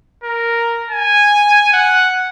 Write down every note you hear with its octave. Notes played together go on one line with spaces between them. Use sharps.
A#4
G#5
F#5